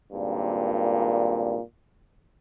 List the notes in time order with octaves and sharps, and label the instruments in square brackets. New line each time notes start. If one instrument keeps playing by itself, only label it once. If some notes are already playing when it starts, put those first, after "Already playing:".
[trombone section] G#1 G2 A#2